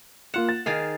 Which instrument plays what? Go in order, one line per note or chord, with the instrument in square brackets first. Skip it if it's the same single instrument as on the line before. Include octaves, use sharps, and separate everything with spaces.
[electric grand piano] A#3 F4 E7 [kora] F#5
[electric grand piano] A6
[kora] D#3 G#4 F5